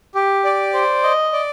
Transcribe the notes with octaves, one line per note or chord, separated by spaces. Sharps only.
G4
D5
C5
D#5
D5